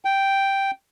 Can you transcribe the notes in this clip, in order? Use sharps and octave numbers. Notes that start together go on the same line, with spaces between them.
G5